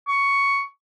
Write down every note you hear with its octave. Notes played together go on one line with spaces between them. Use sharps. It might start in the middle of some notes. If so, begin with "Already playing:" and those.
C#6